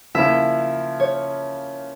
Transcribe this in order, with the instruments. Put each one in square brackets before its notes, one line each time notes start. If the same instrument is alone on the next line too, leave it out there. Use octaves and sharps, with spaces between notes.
[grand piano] C#3 F3 A#3 E4 [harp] E5
[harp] C#5